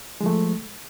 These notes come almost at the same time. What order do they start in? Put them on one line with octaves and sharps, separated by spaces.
G#3 F3 A3